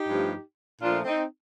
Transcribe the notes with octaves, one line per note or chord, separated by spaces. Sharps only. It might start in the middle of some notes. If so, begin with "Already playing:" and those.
Already playing: D#4 G4
G2 F3 A3
A#2 F3 A3 D4 F4
C4 D#4